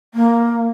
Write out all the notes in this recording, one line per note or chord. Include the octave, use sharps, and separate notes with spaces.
A#3